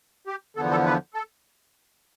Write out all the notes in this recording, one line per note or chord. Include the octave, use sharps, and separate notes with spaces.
G4
E2 D3 F3 B3 A4
A4
B4
A4